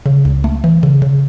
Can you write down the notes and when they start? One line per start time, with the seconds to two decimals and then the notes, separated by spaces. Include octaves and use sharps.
0.06 C#3
0.25 C#2
0.44 A3
0.64 E3
0.83 C#3
1.02 C#3